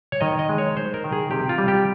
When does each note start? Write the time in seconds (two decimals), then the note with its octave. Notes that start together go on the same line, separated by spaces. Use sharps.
0.12 C#5
0.21 D#3 D#5
0.39 D#5
0.49 G#3
0.58 C#5
0.76 D#4 C5
0.94 A#4
1.04 D#3
1.12 G#4
1.31 C3 G4
1.49 F4
1.58 G3
1.68 G4